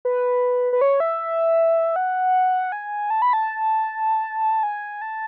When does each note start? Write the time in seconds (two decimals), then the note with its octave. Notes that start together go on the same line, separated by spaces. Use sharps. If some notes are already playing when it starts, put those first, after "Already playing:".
0.05 B4
0.73 B4
0.81 C#5
1.00 E5
1.96 F#5
2.72 G#5
3.10 A5
3.22 B5
3.33 A5
4.63 G#5
5.02 A5